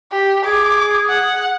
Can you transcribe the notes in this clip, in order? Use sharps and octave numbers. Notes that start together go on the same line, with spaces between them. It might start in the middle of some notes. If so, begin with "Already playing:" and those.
G4
G#4 D6
F#5